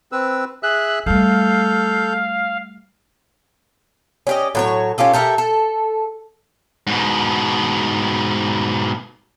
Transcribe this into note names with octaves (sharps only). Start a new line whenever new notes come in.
C4 B4 E6
G#4 E5 E6 F#6
G3 A3 A4 F5 G6
C#4 G4 D#5
A2 F#3 C#5
C#4 F4 G4 A4
G4 A4 A#4 E5
A4
G#2 B2